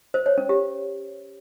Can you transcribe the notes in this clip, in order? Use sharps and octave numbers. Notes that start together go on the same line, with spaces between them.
C5
C#5
C#4
G4